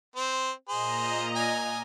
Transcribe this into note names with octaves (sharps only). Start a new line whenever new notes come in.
C4 C5
A#2 G#4 C5 D#5 A#5
G#5